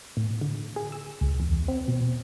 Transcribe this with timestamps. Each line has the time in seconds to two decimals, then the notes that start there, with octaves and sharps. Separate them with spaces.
0.17 A2
0.41 D3
0.76 G#4
0.92 E6
1.21 C#2
1.40 E2
1.68 C4
1.88 B2